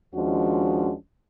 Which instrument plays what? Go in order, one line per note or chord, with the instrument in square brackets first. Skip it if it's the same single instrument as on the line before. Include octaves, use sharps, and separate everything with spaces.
[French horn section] D#2 F3 G#3 C#4 D4 F#4